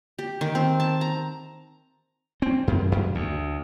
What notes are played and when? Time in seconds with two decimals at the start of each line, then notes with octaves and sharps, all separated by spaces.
0.19 G4
0.41 D#3
0.55 C4
0.80 A5
1.01 A#5
2.42 C4
2.67 F#2
2.92 F#2
3.15 D2